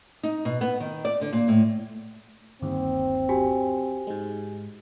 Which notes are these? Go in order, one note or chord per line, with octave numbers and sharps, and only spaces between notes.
D#4
B2
B3
D#3
D5
D3
A#2
A2
G1 D#2 C4
F#4 G4 G#5
G#2 G#3